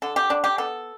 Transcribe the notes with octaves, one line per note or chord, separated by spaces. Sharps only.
D3 A4
G4
D3 D4
G4
B3 A4